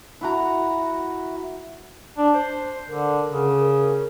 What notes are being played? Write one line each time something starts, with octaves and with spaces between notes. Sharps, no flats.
E4 F#4 A#5
D4
C5
D3 A#4
C#3